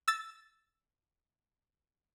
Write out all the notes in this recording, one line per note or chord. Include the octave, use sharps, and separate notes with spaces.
E6 A6